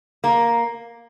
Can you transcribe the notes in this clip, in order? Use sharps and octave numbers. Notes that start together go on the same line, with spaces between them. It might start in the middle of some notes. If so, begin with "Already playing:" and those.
A#3